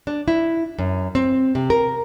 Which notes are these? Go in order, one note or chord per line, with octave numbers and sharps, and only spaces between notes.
D4
E4
F#2
C4
C3
A#4